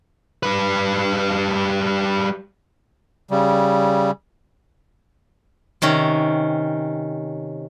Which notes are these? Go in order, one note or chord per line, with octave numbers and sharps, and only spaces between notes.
G3 B4
C#3 G3
C3 D#3 C#4